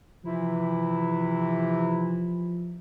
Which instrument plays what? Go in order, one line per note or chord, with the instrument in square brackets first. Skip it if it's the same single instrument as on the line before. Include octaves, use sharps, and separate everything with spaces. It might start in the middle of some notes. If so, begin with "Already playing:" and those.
[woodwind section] C3 E3 E4 [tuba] F3